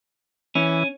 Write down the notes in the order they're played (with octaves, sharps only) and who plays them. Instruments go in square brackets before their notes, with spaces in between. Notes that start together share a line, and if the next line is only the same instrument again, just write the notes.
[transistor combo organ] E3 [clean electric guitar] C#4